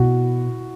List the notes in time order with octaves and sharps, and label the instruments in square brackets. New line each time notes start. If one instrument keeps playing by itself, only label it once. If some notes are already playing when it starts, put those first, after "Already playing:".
Already playing: [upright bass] B2 [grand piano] E4 F#4